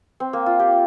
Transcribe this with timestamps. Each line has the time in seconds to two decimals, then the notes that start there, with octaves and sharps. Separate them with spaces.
0.20 C4
0.33 A#3
0.46 F4
0.59 G4